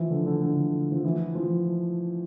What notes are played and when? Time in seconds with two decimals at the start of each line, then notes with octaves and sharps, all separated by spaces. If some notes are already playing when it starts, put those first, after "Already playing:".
Already playing: E3 F3
0.10 D3
0.26 D3
0.41 D3
0.92 F3
1.04 E3
1.35 F3